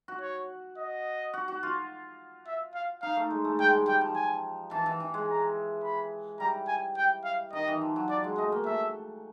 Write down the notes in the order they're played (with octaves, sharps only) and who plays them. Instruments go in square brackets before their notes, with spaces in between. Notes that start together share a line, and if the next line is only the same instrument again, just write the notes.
[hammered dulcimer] F#4
[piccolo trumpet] C#5
D#5
[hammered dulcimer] F#4
F#4
F4
[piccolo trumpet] E5
F5
[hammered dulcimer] D#4 [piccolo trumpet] F5
[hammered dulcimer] A3
G#3
A3
[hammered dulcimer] G#3 [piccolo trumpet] G5
[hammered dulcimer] G3
[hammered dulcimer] G3 [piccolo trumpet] G5
[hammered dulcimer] F3
[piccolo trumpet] G#5
[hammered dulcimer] E3 [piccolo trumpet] A5
[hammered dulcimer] E3
E3
G#3
[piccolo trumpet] A#5
B5
[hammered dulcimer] G3 [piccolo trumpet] A#5
[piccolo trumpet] G#5
G5
F5
[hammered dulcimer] D#3 [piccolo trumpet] D#5
[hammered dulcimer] E3
F3
F#3
[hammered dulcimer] F#3 [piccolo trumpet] D5
[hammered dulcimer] G#3
[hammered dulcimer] A3 [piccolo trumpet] D#5
[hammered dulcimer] A#3
[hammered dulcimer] A3 [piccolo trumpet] E5